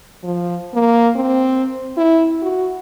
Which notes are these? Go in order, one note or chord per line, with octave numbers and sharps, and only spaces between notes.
F3
A#3
C4
E4
F#4